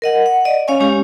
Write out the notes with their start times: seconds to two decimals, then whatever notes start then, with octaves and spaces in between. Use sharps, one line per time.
0.02 A#4 D#5 F#5
0.26 F#5
0.45 D5 D#5
0.68 C#4 C#5 F5 G#5 C#6
0.80 G#3 C#4 G4 G#5